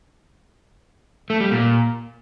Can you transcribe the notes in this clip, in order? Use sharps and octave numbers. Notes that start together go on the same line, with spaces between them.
A3
G3
A#2